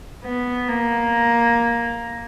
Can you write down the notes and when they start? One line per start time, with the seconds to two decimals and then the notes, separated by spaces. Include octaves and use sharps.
0.24 B3
0.68 A#3